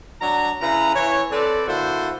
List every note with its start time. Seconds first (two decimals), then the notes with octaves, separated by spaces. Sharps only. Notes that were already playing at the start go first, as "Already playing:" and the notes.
0.21 F#3 D4 A#5
0.61 C#3 E4 B4 A#5
0.95 E3 C#5
1.31 C4 A4 B4 D5
1.67 D3 A#3 E4 F#4 C5